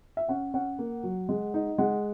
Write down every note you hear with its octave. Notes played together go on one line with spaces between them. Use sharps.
E5
C#4 F#5
C#4 F#5
A#3
F#3
G#3
D#4
G#3 F#5